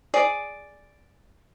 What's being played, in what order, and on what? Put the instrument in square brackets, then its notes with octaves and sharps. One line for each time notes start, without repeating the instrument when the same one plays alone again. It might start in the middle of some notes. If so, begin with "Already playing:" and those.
[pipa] G#4 D5